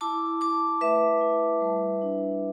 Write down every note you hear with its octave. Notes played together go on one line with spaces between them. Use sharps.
E4 A5 D6
E4 A5 D6
A3 B4 E5
E4
G3
D4